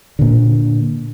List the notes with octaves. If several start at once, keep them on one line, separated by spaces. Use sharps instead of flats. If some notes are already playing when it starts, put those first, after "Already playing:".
A#2 D3